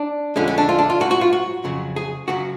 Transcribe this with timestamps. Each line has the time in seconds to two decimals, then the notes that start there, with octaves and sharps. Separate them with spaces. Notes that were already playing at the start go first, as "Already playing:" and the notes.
Already playing: D4
0.36 F2 D3 G#3 C#4
0.48 C#4
0.58 D4
0.69 F4
0.78 D4
0.90 F4
1.00 G#2 F#3 F#4
1.11 F#4
1.21 F4
1.33 F#4
1.64 F2 C#3 F#3
1.96 G#4
2.28 F#2 C#3 F#3 F#4